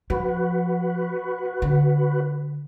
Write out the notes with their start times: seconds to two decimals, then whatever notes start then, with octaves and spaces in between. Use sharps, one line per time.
0.10 F3 F#4 B4
1.62 D3